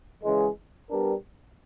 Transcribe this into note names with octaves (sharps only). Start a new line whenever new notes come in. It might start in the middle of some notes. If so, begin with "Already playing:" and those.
C#3 E3 G#3
G3 B3 D4 G4 A#4